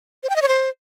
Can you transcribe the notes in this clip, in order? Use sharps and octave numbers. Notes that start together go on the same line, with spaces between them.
C5
G5
D#5
C#5
C5